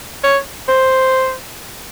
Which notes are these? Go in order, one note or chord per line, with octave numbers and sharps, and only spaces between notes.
C#5
C5